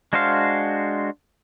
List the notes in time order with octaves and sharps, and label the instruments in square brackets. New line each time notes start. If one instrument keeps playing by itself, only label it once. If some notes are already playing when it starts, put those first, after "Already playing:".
[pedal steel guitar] G#3 D4 F#4 C5 F5